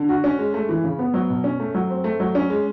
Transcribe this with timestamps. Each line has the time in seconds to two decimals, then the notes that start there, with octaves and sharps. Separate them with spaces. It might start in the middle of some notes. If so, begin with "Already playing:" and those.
Already playing: D3
0.09 F#4
0.24 C#4
0.39 G#3
0.54 A3
0.69 E3
0.84 C#3
0.99 B3
1.14 F#3
1.30 B2
1.44 C#4
1.60 A3
1.74 F#3
1.90 C4
2.04 A3
2.20 F#3
2.35 C#4
2.50 G#3